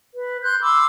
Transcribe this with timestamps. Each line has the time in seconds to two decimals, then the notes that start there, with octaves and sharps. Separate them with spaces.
0.14 B4
0.42 C6 F#6 G6
0.61 B5 C6 D6 E6